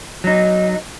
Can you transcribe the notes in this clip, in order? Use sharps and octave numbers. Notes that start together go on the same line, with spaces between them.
F#3 D#4